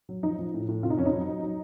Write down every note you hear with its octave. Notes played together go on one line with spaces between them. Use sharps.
F#3
F3 D#4
F3
A2
A2
C3 F4
D#4
F2 C#4
D#4
F#3
F#3
F#3